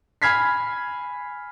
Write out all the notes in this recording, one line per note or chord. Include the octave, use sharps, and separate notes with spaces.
G#5 B5 F6 G#6 B6 C7